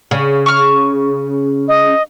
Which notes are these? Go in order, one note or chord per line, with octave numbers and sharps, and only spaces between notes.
C#3
C#6 F6
D#5